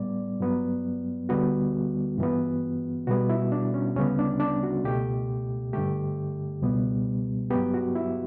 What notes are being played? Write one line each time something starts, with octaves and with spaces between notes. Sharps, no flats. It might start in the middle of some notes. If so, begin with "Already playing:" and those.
Already playing: A2 G3 B3 D5
G2 F#3 B3
D2 D3 G3 B3 F#4
G2 E3 B3
B2 G3 B3 F#4
E4
D4
C#4
D2 C#3 G3 B3 C#4
D4
D4
F#4
C#2 B2 A3 G4
G2 D3 A3 G4
C#2 B2 G3 B3
G2 F#3 B3 G4
F#4
E4